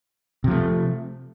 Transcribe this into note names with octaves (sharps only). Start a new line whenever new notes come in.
C3 F3 A3